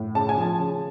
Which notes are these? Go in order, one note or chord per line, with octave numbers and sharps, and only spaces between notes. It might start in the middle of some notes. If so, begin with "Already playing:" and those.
Already playing: A2
C#3 A5
G#5
F3 A5
C#3